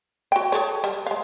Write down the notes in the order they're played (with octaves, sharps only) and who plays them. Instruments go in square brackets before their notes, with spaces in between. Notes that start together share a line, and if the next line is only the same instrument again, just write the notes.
[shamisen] F#4 G5
G#4 A4 C#5
G3
G#3 F5